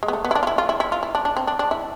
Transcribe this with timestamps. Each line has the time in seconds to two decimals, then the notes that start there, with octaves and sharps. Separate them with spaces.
0.03 G#3
0.08 B3
0.13 A3
0.25 B3
0.31 E4
0.35 D4
0.43 F4
0.47 E4
0.58 F4
0.69 E4
0.80 E4
0.92 F4
1.03 E4
1.15 D4
1.25 D4
1.37 C4
1.47 D4
1.59 D4
1.71 E4